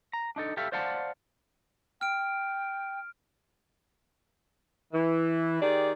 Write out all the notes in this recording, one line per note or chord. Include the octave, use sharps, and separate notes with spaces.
A#5
D4 D#4 A4
G4 A4 E5 F5
C5 D5 F5 F#5 A5
G5 F6 D7
E3
D#3 G4 G#4 D5